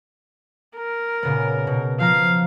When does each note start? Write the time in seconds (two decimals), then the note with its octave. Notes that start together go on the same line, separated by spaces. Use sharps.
0.76 A#4
1.23 A#2 C#3 B3
1.67 B2
2.00 F3 F5 A#5